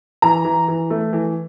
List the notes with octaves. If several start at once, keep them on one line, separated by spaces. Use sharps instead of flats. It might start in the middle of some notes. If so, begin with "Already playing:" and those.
E3 A#5
E3
E3
A3
E3